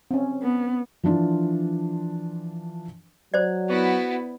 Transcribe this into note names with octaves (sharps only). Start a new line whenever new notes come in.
C4 C#4
B3
E3 F3 D4 F4
F#3 C5 D5
B3 E4 F#4